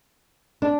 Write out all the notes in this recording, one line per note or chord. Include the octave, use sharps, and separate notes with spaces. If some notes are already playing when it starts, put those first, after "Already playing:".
D4